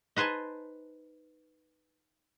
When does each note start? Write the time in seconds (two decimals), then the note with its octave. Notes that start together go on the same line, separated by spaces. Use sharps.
0.16 D#4 B4 C5 G#5 A5